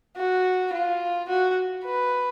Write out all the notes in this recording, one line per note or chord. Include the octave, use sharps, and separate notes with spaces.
F#4
F4
F#4
B4